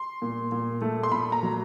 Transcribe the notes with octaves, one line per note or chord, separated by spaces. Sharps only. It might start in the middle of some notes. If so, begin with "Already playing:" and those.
Already playing: C6
A#2
A#2
A3
C6
A#2 B5
A#5
F#3